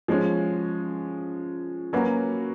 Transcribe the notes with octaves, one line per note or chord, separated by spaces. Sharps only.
F3 G#3 C#4
F#3 A#3 C#4 F#4 B4